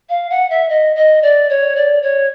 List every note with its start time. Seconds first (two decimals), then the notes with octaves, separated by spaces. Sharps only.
0.09 F5
0.30 F#5
0.50 E5
0.69 D#5
0.95 D#5
1.22 D5
1.49 C#5
1.75 D5
2.02 C#5